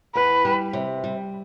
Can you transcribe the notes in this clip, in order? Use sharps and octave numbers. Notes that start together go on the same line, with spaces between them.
E2 B4
G3
C3
G3